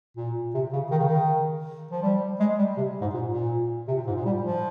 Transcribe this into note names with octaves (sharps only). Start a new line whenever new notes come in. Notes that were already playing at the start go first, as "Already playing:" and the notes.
A#2
C3
C#3
D#3
C#3
D#3
F3
G3
G#3
G3
C3
G#2
A#2
A#2
C3
A#2
G#2
A#2
G3
F3